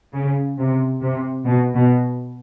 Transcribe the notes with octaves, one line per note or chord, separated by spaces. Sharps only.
C#3
C3
C3
B2
B2